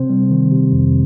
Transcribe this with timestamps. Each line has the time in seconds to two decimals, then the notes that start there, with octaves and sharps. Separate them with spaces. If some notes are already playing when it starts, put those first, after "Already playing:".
Already playing: C3 C4 C5
0.10 G3
0.31 D#3
0.52 C3
0.72 F2